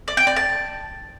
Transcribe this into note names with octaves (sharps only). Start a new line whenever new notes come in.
D5
G5
D5
A5